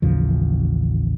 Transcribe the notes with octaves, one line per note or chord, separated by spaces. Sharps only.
A1 D#2 C#3 F3